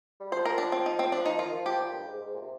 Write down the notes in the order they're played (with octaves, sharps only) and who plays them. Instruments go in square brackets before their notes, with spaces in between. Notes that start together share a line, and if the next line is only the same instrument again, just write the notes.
[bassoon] G3
[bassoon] F3 [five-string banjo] C5
[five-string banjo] A#4
D4
C4
D#4
C4
D4
D#4
[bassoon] F3
[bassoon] D#3 [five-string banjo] F4
[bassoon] F3
[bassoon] F3 [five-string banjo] G4
[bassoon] A#2
G2
G#2
G#2
A#2
C3